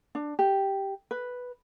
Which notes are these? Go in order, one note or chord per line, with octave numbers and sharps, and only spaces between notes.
D4
G4
B4